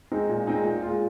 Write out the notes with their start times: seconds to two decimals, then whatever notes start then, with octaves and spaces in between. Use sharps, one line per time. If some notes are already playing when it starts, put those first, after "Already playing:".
0.11 G#3 C4 D#4
0.29 A#2
0.47 G#3 C4 D#4
0.65 A#2
0.82 G#3 F4